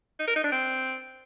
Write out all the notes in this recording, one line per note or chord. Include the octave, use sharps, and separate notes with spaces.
D#4
A#4
D#4
D4
C4